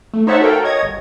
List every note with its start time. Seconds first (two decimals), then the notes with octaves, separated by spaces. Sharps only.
0.14 A3
0.27 D#4 C5 C#5 E5 F#5 A5
0.40 F#4 A4 A#4 F5 G5
0.64 C#5 D#5 G#6 A#6
0.83 G1